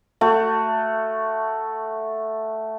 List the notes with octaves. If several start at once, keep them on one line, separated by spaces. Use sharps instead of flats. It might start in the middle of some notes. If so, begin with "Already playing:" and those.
A3 F#4